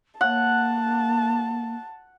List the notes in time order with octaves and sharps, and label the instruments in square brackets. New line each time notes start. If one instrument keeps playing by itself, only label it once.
[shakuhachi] A#3 [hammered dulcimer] F#5 [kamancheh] A5